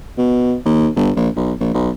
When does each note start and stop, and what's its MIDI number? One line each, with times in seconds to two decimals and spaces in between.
0.18 0.54 47
0.65 0.88 39
0.96 1.11 31
1.16 1.28 34
1.36 1.53 35
1.60 1.69 34
1.74 1.90 35